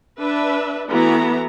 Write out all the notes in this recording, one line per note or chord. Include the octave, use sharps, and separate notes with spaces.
D4 B4 E5
E3 A3 B3 F#4 A#5